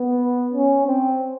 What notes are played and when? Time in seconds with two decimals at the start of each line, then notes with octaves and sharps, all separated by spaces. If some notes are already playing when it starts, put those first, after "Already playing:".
Already playing: B3
0.53 C#4
0.86 C4